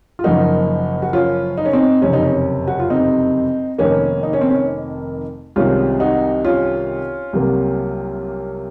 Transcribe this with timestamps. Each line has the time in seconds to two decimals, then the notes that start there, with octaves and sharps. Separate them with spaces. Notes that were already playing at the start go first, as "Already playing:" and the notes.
0.19 F4
0.24 F#1 F#2 F3 A#3 D#4 F#4
1.02 F#4
1.13 C#4 F4
1.58 D#4
1.65 C#4
1.73 C4 D#4
2.01 F#1 F2 C3 C#4
2.13 D#4
2.23 C#4
2.67 F#4
2.80 F4
2.90 C4 D#4
3.79 F1 F2 D#3 A#3 C#4
4.23 D#4
4.33 C#4
4.41 C4
4.50 C#4
5.56 C2 C3 D#3 G#3 C4 C#4 F4
6.00 D#4 F#4
6.44 C#4 F4
7.33 C2 C3 F#3 A#3